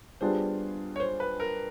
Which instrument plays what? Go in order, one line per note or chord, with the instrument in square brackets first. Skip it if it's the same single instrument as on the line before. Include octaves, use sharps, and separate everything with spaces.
[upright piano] G3 B3 D4 F4 G#4 [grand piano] C5
[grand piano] C#5
C5
B4
A#4